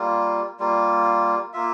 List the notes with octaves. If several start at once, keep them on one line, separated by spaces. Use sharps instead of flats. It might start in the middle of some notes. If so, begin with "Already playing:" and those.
Already playing: G3 A#3 F4
G3 A#3 F4
A#3 F4 E5